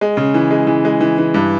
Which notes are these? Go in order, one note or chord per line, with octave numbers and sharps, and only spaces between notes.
G#3
C#3
E3
G#3
E3
G#3
E3
E3
G2